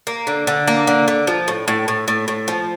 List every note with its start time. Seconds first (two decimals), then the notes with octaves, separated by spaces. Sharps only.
0.07 A#3
0.27 D3
0.47 D3
0.67 A#3
0.87 D3
1.08 D3
1.27 F3
1.48 A2
1.68 A2
1.88 A2
2.08 A2
2.28 A2
2.48 F3